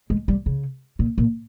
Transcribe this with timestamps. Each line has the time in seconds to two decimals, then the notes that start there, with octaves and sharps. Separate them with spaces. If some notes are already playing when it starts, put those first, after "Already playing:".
0.10 G#3
0.28 G3
0.46 C#3
0.99 A#2
1.18 A#2